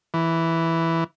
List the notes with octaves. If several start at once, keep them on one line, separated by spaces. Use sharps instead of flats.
E3